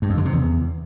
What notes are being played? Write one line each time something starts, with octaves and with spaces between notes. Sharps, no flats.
G2
F2
D3
C3
E2